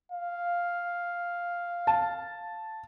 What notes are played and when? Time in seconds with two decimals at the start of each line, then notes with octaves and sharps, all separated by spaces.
0.12 F5
1.87 A5